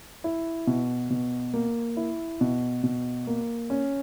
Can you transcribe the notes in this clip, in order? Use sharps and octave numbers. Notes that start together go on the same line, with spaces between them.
E4
B2
B2
A#3
E4
B2
B2
A#3
C#4